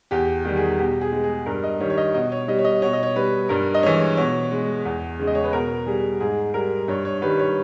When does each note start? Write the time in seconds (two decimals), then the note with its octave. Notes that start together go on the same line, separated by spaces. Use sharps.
0.11 E2 G4
0.45 D#3 G3
0.57 G#4
0.79 B2 G4
1.01 G#4
1.12 G#3
1.24 G#4
1.46 G2 A#4
1.64 D#5
1.80 D#3 G3 C#5
1.90 C#5
1.97 D#5
2.14 B2 D#5
2.32 C#5
2.48 G3 D#5
2.59 C#5
2.65 D#5
2.82 B2 C#5
2.93 D#5
3.03 C#5
3.16 G3 B4
3.49 G2 A#4
3.74 D#5
3.83 E3 G#3 C#5
4.17 B2 C#5
4.52 G#3
4.85 E2
5.19 C#3 G#3
5.27 D#5
5.35 C#5
5.44 B4
5.53 B2 A#4
5.87 G3 G#4
6.20 G#2 G#4
6.54 G3 A#4
6.88 G2 C#5
7.05 C#5
7.22 D#3 G3 B4
7.39 C#5